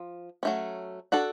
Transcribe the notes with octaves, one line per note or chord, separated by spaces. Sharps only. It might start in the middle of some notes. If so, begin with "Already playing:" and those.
Already playing: F3
F#3 A3 C#4
D4 F#4 A4